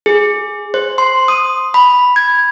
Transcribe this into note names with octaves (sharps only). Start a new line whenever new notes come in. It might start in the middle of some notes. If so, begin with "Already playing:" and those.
G#4
C5
C6
D#6
B5
G#6